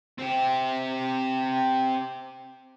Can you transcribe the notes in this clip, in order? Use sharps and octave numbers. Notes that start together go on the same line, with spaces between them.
C4 G4